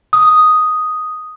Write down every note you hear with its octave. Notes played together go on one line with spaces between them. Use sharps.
D#6